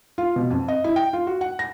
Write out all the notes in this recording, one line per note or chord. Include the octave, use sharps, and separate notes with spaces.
F4
B2
F2
D#5
E4
G5
F4
F#4
F#5
A#6